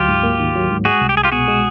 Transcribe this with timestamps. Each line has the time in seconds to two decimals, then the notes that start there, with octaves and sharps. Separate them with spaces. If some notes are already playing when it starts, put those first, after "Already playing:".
Already playing: D2 F#3 F4 G4
0.09 G#2
0.23 A#3
0.39 D#3
0.55 F#3
0.70 G#2
0.85 G#3 F#4 G#4
1.01 C2
1.09 G4
1.17 C2 G#4
1.24 F4 G4
1.32 B2 F#4 G#4
1.48 G#3